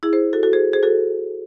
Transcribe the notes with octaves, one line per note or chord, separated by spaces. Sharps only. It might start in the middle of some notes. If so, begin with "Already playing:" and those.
E4 G#4
G#4 C5
F#4 A4
F#4 A4
G#4 C5
G#4 C5
F#4 A4